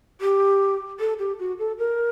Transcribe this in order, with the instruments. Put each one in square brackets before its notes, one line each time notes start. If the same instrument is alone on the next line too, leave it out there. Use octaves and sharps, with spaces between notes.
[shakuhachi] G4
A4
G4
F#4
A4
A#4